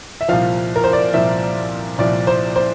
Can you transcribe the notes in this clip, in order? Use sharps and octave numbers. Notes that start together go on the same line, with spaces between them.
E5
C2 A#2 F3 F5
A#4
C5
D5
C2 A#2 F3 E5
C2 A#2 F3 D5
C5
C5